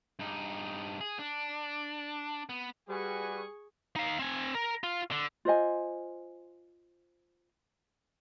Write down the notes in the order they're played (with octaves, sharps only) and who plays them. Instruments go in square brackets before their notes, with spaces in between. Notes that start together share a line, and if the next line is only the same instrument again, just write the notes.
[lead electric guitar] G2 D#4
G#4
D4
B3
[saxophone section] G3 [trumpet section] F#4 B4 G#5 [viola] G#4 C#6
[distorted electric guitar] D#4 F5
C4 G#5
A#4
F4
D3
[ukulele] F4 C5 D#5 G#5